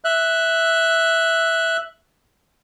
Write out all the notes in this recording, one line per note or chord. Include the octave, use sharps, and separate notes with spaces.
E5 F#6